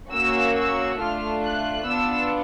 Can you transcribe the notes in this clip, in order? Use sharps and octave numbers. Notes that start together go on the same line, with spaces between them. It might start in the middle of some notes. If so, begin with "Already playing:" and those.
A#3 C#4 F#4 E6
E6
A3 D4 F4 F6
F#6
B3 D4 F4 E6